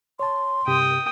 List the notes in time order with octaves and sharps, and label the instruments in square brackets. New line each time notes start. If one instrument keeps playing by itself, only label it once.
[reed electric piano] C#5 A5 [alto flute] C6
[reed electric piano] G2 C3 G4 [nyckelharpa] G5 D#6